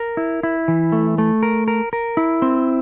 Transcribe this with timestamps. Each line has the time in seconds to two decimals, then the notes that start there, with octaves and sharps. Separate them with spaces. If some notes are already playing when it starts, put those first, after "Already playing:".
Already playing: A#4
0.17 E4
0.43 E4
0.68 E3
0.92 A3
1.18 A3
1.43 A#4
1.68 A#4
1.93 A#4
2.17 E4
2.42 C4